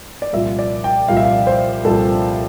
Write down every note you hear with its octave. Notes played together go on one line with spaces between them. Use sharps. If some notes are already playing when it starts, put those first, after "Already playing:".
D5
C2 A#2 F3 E5
D5
G5
C2 A#2 F3 F5
E5
F5
C5
C2 A#2 F3 A4